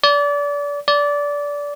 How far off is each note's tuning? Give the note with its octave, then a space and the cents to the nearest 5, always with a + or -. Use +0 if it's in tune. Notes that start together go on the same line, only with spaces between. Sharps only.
D5 -30
D5 -20